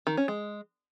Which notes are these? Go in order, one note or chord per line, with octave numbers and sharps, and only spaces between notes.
D#3
C#4
G#3